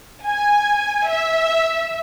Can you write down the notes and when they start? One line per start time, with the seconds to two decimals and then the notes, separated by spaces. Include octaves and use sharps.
0.25 G#5
1.09 E5